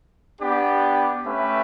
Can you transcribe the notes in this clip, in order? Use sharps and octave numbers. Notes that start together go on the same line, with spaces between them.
B3 D4 G4
A3 C#4 G4 B4 E5